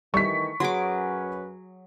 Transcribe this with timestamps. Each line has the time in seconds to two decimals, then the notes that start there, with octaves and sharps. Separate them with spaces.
0.14 D#3 E3 G3 A3 C#6 B6
0.60 F#2 F#3 C#4 G#4 B4 C6 D6